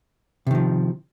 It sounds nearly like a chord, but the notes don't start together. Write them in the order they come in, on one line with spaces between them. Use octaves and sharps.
C3 D#3 F3